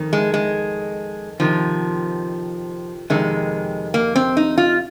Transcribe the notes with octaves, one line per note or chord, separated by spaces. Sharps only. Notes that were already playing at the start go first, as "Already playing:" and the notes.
Already playing: F2 D#3
G#3
G#3
F2 C3 D#3 F3
F2 C3 D#3 G#3
A#3
C4
D#4
F4